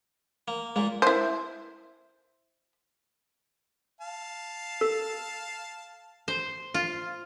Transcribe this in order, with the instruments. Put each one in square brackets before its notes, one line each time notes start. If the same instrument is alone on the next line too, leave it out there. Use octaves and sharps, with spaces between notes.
[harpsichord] A#3
[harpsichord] A#2 A#3 [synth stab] G#3
[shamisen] E4 C5
[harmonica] F5 A5
[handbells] A4
[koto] C5
F4